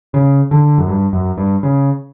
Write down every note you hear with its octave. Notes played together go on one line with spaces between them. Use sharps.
C#3
D3
F#2
G2
F#2
G2
C#3